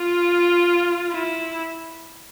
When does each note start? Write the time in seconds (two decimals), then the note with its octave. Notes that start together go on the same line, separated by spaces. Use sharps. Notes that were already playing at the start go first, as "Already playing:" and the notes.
Already playing: F4
1.12 E4